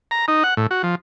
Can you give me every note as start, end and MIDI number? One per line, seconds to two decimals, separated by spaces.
0.11 0.26 82
0.28 0.43 63
0.44 0.54 78
0.57 0.67 45
0.71 0.82 66
0.83 0.95 53